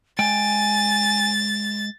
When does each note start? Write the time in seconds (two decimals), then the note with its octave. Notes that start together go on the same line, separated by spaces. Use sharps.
0.19 G#3 G5 G#5 A6